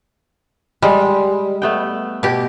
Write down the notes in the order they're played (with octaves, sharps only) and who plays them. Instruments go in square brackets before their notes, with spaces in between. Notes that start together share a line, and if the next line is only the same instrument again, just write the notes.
[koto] G3 [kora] G#3
[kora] A3 B3 G5
[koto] B2 G4